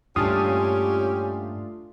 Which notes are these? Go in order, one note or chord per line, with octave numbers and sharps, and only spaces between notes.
G2 A#2 A3 C#4 D4 F4 G4 D#6